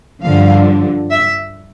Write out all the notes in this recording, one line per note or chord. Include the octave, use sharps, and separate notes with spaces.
G2 D3 F3 F5
E5